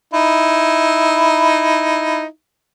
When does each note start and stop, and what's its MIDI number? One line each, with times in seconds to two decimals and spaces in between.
0.14 2.25 63
0.14 2.25 64